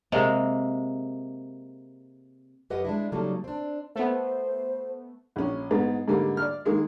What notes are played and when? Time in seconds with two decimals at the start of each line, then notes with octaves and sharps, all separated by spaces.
0.12 C3 G#3 A#3
2.70 F#2 G4 B4 D#5 F#5
2.84 G#3 D4 E4
3.12 C#3 F#3 G3 A#3 D#4 A4
3.44 C4 D4
3.96 A3 B3 C5
5.36 A#1 C#4
5.71 G#2 B3
6.08 G#2 D3 G3 A#3
6.37 D5 F6
6.65 D#3 G#3 A#3